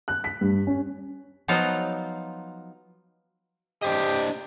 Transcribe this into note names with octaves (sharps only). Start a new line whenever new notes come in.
F#6
B6
G2
C#4
F3 F#3 B3 D#4 F4 F#4
D4 G4 C5 D#5